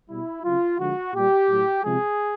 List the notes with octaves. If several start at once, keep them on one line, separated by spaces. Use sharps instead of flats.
B2 G3 E4
C#3 F#3 F4
D3 F3 G#3 F#4
A#2 G3 G4
A2 F#3
C3 F3 G#3 G#4